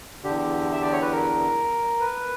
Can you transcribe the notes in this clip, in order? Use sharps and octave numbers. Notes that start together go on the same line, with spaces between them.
E2 D3 G4
E5
D5
C#5
B4
A#4
B4